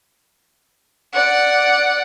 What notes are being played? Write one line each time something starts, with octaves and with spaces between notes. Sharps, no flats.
D5 F#5